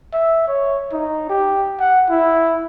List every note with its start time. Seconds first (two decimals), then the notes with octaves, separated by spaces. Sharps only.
0.13 E5
0.48 C#5
0.93 D#4
1.30 G4
1.80 F#5
2.10 E4